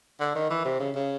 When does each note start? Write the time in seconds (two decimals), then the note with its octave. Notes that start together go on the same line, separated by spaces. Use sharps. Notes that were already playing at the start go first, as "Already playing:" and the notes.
0.20 D3
0.36 D#3
0.50 E3
0.65 C3
0.80 C#3
0.96 C#3